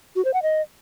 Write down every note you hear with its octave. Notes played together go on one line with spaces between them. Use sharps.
F#4
C5
F#5
D#5